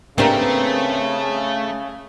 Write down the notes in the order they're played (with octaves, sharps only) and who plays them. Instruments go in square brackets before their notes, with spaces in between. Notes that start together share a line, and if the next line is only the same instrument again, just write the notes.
[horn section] C#3 [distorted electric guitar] A3 [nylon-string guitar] A#3 D4 B4 [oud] C4 G4 A#4